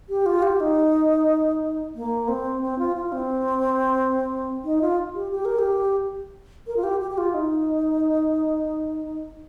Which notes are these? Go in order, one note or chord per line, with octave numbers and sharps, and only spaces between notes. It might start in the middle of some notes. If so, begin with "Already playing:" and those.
G4
F4
G4
D#4
A#3
C4
C4
F4
F4
C4
D#4
F4
G4
G4
A#4
G4
A#4
F4
G4
G4
G4
F4
D#4